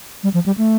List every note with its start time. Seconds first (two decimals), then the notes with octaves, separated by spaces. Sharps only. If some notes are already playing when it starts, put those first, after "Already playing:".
0.23 G3
0.34 F3
0.46 G3
0.58 A3